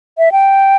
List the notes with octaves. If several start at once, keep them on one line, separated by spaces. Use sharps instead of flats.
E5
G5